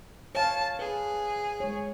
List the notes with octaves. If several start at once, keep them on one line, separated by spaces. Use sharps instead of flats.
C#5 F5 A5
G#4 B4
G#3 C#5